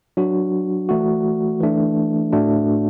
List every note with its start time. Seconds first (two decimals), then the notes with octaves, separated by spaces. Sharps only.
0.17 F#3 D4 F#4
0.89 E3 A3 F#4
1.60 E3 A3 D4
2.32 A2 A3 D4 F#4